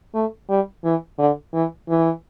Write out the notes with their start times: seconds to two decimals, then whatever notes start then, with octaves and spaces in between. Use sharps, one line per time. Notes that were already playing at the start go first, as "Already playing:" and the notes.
0.14 A3
0.49 G3
0.84 E3
1.19 D3
1.54 E3
1.89 E3